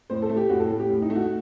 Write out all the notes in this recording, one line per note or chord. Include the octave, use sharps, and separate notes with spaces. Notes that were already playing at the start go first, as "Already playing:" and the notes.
A2 C5
A4
A3
G4
A2 F#4
A4
A2
G4
A2
D#4
A3
F#4